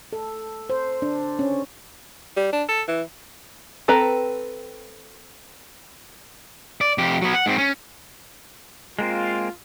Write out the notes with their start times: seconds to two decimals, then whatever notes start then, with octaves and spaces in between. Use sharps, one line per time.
0.13 A4
0.70 C5
1.02 D4
1.39 C#4
2.37 G3
2.53 D4
2.69 A4
2.88 E3
3.88 C4 A4 B4 G5 A#5
6.81 D5
6.98 F2 G4
7.22 F#3 B3
7.34 F#5
7.46 G#2 C4
7.58 C#4
8.99 G#3 A#3 C4 F4